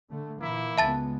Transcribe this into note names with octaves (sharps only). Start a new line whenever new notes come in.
D3 A3
A#2 E3 A#3 E4
C#2 G#3 B3 E5 A5 A6